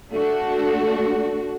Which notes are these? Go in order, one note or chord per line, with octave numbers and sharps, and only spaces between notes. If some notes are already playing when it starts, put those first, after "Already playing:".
A3 D4 F#4